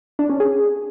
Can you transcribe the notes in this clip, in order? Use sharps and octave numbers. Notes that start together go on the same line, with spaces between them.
D4
C#4
G#4